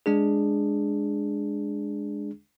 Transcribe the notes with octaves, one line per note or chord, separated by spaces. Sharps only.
G#3 D4 G#4